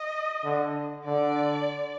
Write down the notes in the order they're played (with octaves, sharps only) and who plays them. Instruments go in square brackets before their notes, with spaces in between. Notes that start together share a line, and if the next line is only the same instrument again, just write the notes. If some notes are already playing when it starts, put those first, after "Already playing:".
Already playing: [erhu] D#5
[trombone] D3
[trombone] D3 [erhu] D5